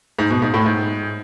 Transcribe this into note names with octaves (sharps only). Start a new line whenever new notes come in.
G#2
B2
G#2
A2
G#2